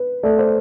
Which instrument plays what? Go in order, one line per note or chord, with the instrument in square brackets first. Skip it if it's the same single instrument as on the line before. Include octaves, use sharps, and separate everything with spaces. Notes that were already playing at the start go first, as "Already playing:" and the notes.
Already playing: [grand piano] B4
[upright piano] A3 [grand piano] D5
[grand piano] C5